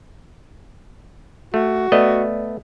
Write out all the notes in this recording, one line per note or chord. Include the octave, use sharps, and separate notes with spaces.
A3 F#4
A3 B3 D5 D#5